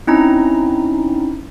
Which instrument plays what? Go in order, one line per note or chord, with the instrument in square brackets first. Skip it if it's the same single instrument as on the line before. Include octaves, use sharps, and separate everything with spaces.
[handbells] C4 C#4 D#4 E4 A#5